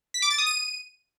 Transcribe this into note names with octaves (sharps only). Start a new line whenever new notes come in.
B6
D6
A6
D#6
D#7